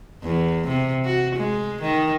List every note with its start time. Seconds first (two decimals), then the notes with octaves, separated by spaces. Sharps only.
0.23 E2
0.67 C3
1.05 F#4
1.35 G#3
1.82 D#3